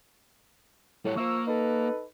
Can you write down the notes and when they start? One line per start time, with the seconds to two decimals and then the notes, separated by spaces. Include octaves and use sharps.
1.05 A2 G3 C#5
1.17 F3 A#3 C#6 E6
1.47 D#4 A4 B4